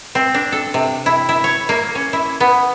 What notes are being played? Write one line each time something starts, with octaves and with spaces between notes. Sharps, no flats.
C4
D4
A4
C3
E4
E4
C#5
A#3
C#4
E4
B3